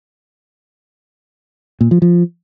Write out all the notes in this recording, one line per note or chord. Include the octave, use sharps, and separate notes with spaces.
A#2
F3
F3